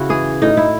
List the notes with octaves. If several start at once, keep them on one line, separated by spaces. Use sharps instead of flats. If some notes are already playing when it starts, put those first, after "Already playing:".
Already playing: C#3 E4 F#4
E3 G#4
A2 D#4
E4